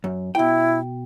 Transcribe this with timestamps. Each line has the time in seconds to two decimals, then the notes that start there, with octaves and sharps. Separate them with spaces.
0.04 F#2
0.35 B2 E4 G5